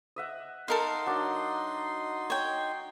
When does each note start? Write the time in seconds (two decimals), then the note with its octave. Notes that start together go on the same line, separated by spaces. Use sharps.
0.16 D#5 E5 F#5
0.68 D#4 A4 A#4 F5 C6
1.06 F#3 D4
2.30 C#5 G5